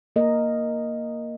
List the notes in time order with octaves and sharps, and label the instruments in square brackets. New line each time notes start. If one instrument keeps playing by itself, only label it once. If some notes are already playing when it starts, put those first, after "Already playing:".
[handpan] A#3 A#4 D#5